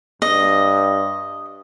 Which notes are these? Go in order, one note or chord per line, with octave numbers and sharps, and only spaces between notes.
G2 D#5